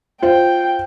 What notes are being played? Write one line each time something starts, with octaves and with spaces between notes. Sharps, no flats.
F4 C5 F5 G5